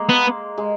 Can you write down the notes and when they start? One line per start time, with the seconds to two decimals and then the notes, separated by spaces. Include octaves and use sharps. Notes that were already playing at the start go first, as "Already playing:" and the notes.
Already playing: G#3 A#3
0.09 B3
0.58 G#3